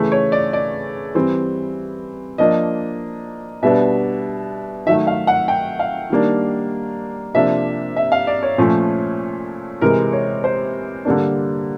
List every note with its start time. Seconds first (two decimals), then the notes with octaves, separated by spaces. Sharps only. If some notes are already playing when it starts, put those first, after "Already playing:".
Already playing: C#3 E3 A3
0.12 C#5
0.32 D5
0.53 D5
1.15 E3 G3 C4
2.38 F3 A#3 D4 D#5
3.63 B2 G3 B3 D4 E5
4.86 D#3 F#3 A3 E5
5.07 F5
5.27 F#5
5.48 G5
5.79 F5
6.10 D#3 G3 A#3 D4
7.34 C3 F3 A#3 D4 E5
7.96 E5
8.12 F5
8.27 D5
8.43 C#5
8.58 A#2 F3 A3 C#4
9.81 C3 E3 G#3 A#4
10.13 C#5
10.44 C5
11.05 D3 G3 A#3 D4